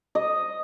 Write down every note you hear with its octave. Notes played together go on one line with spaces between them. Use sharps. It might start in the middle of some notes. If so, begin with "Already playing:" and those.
D#5